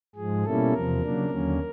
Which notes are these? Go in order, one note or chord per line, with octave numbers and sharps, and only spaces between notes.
G#2 F3 G#3 G#4
B2 G3 A#3 C#4 E4 A4
E2 C3 F3 A#4
C#3 F#3 A#3 D4
D#2 D3 F#3 A#3 C#4